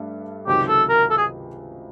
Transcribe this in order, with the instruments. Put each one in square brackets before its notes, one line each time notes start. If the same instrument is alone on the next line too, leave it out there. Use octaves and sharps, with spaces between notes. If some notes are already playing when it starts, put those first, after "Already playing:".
Already playing: [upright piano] G2 A3
[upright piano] C#2 C3 D#3 F#3 [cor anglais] G4
[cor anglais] A4
A#4
A4
G#4